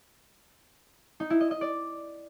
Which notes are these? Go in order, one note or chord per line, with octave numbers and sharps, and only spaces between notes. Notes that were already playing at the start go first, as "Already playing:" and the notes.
D#4
E4
D#5
D#5
D5